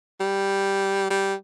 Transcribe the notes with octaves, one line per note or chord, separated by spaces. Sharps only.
G3
G3